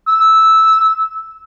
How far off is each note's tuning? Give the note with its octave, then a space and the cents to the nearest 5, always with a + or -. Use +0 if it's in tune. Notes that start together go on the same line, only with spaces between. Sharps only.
E6 -10